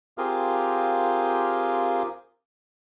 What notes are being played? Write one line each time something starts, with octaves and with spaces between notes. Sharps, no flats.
C4 F4 G4 G#4 A#4 F5